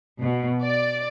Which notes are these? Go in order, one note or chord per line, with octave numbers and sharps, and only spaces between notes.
B2
D5